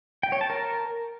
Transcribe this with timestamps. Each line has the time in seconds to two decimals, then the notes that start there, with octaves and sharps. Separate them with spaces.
0.23 G5
0.32 C#5
0.41 A5
0.50 A#4